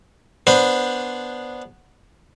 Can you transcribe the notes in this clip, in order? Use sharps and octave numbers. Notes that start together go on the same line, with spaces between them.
B3 D4 C5